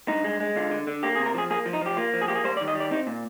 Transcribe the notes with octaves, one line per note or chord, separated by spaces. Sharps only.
G2 D#4
G#3
G#3
D3 F4
D3
D3
A#3 G4
G#4
C3
A#4
F3 G#4
A#3 G#4
F3
D#4
F3 G4
A#3 F4
F3
G#4
A#3 G4
G#4
G3 C5
D5
D#3
D#5
G3 D5
C4 D#4
A#2